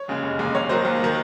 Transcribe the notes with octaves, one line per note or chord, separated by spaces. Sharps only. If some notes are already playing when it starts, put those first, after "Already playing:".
Already playing: C#5
D#2 C#3 G#3
F1
D#2 C#3 G#3
D#2 C#5
D#3 F#3 C5
D#2
D#3 F#3